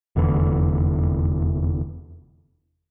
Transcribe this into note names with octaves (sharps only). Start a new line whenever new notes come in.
F1 E2 D3 E3